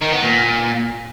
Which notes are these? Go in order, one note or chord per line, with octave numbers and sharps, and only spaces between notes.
D#3
B3
A#2